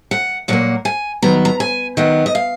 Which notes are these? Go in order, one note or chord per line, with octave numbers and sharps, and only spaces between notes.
F#5
A#2 F#3 A#3 F#5
G#5
D#3 F#3 B3 A#5
A#5
G#5
D#3 F#3 B3 F#5
D#5
F5